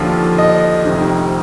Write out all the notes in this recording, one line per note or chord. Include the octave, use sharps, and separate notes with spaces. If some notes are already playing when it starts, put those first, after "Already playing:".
Already playing: D#2 D3 F3 F5
D#5
F1 F2 C3 D#3